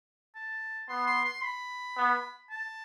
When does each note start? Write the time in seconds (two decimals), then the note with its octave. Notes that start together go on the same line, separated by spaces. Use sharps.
0.35 A5
0.89 B3 C6
1.07 C6
1.25 C6
1.44 B5
1.97 B3
2.50 A5